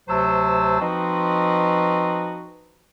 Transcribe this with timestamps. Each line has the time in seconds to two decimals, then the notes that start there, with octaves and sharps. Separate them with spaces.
0.09 D2 C3 F#3 C5 A5 E6
0.80 F3 C4 D#4 F#4 B4 D#5